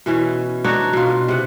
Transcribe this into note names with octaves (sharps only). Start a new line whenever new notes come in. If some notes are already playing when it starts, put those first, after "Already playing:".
B2 E3 C#4
D4 D#4 F#4 C#5
B2 F4
C3 F#5